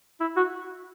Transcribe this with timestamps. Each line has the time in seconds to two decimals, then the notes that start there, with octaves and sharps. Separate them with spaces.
0.20 E4
0.37 F#4